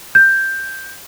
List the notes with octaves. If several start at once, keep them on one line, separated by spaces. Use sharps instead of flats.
G6